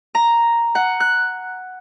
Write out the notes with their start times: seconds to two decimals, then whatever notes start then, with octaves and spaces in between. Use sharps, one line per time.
0.15 A#5
0.75 F#5
1.00 F#6